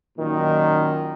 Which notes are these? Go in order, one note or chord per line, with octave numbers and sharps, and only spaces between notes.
F#2 A#2 D#3